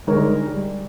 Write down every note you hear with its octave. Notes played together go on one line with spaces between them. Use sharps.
D3 G3 G#3 D#4 A#4 C#5
G3